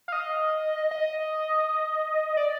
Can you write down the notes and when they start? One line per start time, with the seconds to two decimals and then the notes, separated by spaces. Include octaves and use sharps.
0.08 F5
0.12 D#5
0.91 D#5
2.37 D5